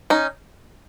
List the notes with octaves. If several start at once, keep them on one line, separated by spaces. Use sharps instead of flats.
C#4 D#4